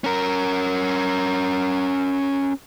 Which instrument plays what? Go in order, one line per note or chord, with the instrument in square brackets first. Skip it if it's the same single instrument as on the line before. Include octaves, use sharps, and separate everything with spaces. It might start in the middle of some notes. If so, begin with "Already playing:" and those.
[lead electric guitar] C#4 A#4